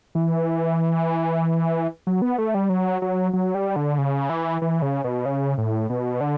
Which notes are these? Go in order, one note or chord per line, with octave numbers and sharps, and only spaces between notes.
E3
F#3
B3
A3
G3
F#3
F#3
F#3
G3
D3
C#3
E3
E3
C#3
B2
C#3
A2
B2
D3